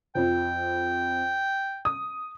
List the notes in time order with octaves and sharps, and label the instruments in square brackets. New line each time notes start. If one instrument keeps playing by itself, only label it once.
[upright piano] F2 F3 [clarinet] G5
[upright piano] D#6